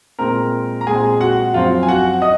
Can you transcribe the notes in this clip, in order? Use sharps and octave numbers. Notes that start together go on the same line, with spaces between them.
A#2 G#3 C4 A#4 A#5
A#5
A#2 G#3 C4 G#4 G#5
F#4 F#5
F#2 F3 C4 F4 F5
G#5
F#4 F#5
D#5 D#6